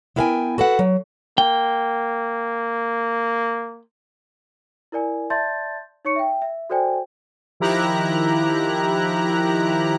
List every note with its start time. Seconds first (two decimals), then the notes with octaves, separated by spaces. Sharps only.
0.16 B3 E4 A#4 F5 G5 G#5
0.58 F#4 A4 B4 F#5
0.79 F#3
1.38 A#3 G5
4.92 E4 A#4 D5 G#5
5.30 D5 E5 A5 C6 G6 A6
6.05 D#4 C#5 C#6 C#7
6.16 E5 G5
6.42 E5
6.70 F#4 A4 C5 D5 G5 G#5
7.60 D#3 F3 E4 G4 A#5 F#6